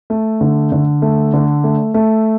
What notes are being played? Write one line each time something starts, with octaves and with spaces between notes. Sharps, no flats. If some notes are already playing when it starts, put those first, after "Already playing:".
A3
D3
D3
A3
D3
A3
A3